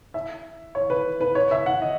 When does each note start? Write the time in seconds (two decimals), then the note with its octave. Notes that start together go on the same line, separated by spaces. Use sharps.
0.14 E5
0.75 C#5
0.90 B4
1.21 B4
1.35 C#5
1.51 E5
1.66 F#5
1.81 D#5